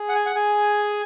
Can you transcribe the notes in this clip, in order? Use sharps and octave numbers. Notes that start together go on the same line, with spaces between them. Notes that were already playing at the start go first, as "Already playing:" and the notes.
Already playing: G#4
F#5
G#5
F#5
G#4 G#5